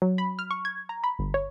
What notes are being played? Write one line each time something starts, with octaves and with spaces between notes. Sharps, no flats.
F#3
B5
F6
C#6
G#6
A#5
B5
G1
C#5